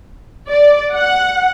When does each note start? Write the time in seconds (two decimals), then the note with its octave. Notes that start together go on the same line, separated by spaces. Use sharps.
0.49 D5
0.95 F#5